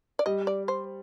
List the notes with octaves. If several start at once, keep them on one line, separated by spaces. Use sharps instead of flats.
D5
G3 D#5
D5
C5